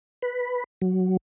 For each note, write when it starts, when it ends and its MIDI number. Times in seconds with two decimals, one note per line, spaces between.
0.22 0.64 71
0.82 1.17 54